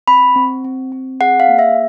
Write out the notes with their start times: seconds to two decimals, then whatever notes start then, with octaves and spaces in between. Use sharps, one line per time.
0.08 C4 B5
0.36 C4
0.64 C4
0.92 C4
1.21 G#4 F#5
1.40 F5
1.49 A#3
1.59 E5